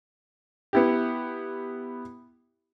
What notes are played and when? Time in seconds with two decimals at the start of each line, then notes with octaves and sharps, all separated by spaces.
0.73 B3 E4 G4